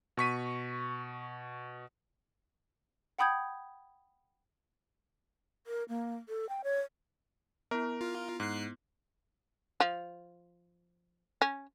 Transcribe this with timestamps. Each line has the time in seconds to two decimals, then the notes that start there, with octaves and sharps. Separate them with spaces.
0.17 B2 C#6 B6 D#7
3.19 F#5 G5 B5 D#6 G6 G#6
5.67 A#4
5.89 A#3
6.29 A4
6.49 G5
6.64 C#5
7.71 B3 E4 A#4
8.01 F4
8.40 G#2 F#6 C7
9.80 F3
11.42 C#4